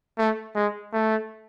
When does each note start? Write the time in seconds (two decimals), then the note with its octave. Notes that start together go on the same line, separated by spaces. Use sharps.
0.18 A3
0.55 G#3
0.93 A3